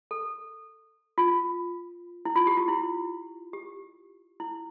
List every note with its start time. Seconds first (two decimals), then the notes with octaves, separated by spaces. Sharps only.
0.11 A4
1.18 F4
2.25 E4
2.36 F4
2.47 G4
2.57 F4
2.68 E4
3.53 G4
4.40 E4